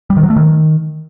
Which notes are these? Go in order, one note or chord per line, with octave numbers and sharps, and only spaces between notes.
G3
D#3
F#3
A3
D#3